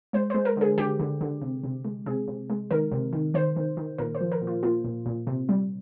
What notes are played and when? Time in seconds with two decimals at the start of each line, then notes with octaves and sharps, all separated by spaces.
0.13 G#3 C5
0.30 G#3 C5
0.45 A#4
0.57 D3 G#4
0.78 D3 G4
1.00 D3
1.21 D3
1.41 C3
1.64 C3
1.85 G#3
2.06 C3 G#4
2.28 C3
2.50 G#3
2.71 D#3 A#4
2.92 C3
3.13 D#3
3.34 D#3 C5
3.56 D#3
3.77 D#3
3.98 A#2 A#4
4.15 C5
4.21 F3
4.32 A#4
4.41 A#2
4.47 F4
4.63 A#3 F4
4.85 A#2
5.06 A#2
5.27 C3
5.49 G3